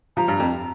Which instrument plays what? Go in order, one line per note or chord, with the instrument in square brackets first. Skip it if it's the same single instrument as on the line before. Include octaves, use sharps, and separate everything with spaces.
[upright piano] F3 [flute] A#5
[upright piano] G2
F2